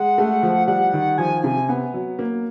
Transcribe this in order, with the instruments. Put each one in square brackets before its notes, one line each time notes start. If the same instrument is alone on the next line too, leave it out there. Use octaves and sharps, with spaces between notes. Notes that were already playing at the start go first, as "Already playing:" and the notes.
Already playing: [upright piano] G#3 [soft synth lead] F#5
[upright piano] A3
F3
[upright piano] G3 [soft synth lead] F#5
[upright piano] D#3
[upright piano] F3 [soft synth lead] G#5
[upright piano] C3
B3
F#3
A#3